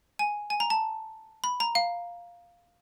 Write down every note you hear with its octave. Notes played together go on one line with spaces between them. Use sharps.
G#5
G#5
A#5
A5
B5
A#5
F5